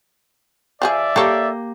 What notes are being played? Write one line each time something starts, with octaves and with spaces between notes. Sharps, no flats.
F3 G4 G#4 D5 E5
A#3 G4 A4 C#5